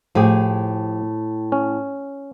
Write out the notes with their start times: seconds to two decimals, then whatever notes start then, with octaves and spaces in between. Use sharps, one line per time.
0.15 A2 F3 G4 G#4
1.52 C#4